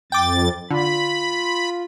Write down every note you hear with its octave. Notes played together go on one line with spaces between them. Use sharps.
F2 G5 D6 A6
D3 F4 B5